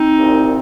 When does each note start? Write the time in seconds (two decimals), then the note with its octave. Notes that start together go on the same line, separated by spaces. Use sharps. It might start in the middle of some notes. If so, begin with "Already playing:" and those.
Already playing: C4 D#4
0.18 C2 A#2